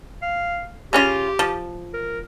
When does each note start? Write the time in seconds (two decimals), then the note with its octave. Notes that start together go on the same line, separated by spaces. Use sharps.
0.22 F5
0.93 C#3 C#4 F4 G4
1.39 F3
1.94 A#4